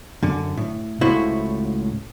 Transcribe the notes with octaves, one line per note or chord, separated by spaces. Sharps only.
F#2 D3
A2
C#2 A2 E4 F#4 C5